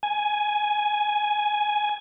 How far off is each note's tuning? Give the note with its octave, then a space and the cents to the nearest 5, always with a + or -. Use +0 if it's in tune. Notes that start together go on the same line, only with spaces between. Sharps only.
G#5 +10